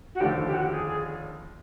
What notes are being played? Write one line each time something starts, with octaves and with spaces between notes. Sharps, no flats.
F#4
F1 D#2 D3 F3 A3 G4
G4
F#4
G4
G#4
G#4